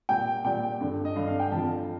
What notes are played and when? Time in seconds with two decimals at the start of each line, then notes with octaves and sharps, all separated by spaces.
0.09 A#2 G3 G5
0.44 A#2 G3 G5
0.81 G2 D3 G3
1.05 D#5
1.16 G2 D3 G3 F5
1.27 F5
1.39 G5
1.52 F2 D3 F3 A5